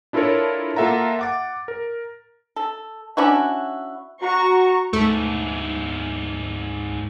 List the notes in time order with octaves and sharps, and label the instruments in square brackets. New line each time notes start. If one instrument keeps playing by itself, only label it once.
[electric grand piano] D4 E4 F4 A4 A#4 C#5
A#3 F4 A4 E5 F#5 A#5
F#5 D6 A6
A#4
[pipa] A4
C#4 D4 E4 F#4
[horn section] F#4 [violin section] A#5 C#6
[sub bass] D2 [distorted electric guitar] G#2 E4 [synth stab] A3